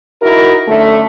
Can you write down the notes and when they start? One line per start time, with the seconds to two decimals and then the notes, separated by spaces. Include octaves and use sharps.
0.22 D#4 E4 F#4 A#4
0.68 F#2 D3 A3